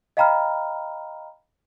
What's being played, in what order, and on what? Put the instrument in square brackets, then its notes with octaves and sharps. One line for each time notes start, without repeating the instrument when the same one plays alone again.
[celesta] D#5 F5 G5 A#5 B5 F6